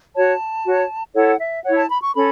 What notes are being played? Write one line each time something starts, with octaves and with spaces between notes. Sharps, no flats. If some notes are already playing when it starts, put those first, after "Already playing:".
F#4 C#5 A5
F#4 C#5
E4 A4 C#5 F#5
E5
E4 C#5 F#5
A5
B5
C#6
C#4 A4 B5